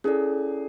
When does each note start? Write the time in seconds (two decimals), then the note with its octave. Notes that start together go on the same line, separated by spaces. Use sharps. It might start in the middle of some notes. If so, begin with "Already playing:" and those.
0.04 C#4 E4 G#4 A4 D5